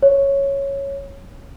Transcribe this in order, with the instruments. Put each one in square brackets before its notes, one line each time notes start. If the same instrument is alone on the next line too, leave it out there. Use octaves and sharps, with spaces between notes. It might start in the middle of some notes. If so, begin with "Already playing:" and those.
[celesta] C#5